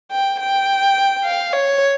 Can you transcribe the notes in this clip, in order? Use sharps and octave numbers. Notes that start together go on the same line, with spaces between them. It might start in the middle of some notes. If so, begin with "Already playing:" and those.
G5
G5
F5
C#5